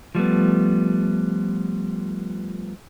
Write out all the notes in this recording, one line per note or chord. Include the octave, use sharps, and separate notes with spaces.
F3 G3 A3 B3